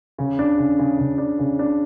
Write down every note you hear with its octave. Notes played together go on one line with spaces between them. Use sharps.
C#3
D4
C#3
C#3
C#3
D4
C#3
D4